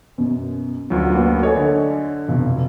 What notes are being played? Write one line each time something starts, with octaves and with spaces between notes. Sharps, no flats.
F#2 B2
D2 F#3 C#4 F4 B4
A#3 F#4 B4
A4 C#5 D#5 G#5
D3
F1 B1